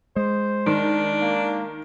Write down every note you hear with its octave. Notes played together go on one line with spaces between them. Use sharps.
G#3 C5
D#3 D4
A#3